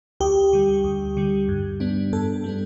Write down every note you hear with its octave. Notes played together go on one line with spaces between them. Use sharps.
D2 G4
D3 G3
D2
D3 G3
G2
G3 B3 D4
G2 A4
G3 B3 D4